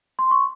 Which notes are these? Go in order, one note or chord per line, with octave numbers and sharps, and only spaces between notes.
C6
C#6